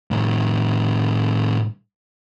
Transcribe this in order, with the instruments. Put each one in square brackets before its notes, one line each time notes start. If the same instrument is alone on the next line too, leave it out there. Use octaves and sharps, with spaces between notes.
[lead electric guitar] A2 D#3